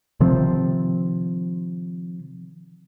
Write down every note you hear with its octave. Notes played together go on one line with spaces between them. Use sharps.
C3 D#3 F3 C4